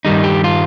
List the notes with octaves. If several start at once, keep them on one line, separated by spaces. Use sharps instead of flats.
G2 D#3 G3 D#4
G4
F4